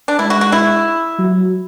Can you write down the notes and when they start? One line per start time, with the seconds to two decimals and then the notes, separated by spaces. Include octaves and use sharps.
0.08 D4
0.19 G#3 E4
0.30 F#4
0.41 F#4
0.52 E4
1.19 F#3